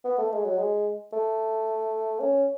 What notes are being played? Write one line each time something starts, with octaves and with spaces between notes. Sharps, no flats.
B3
A3
G#3
F#3
G#3
A3
C#4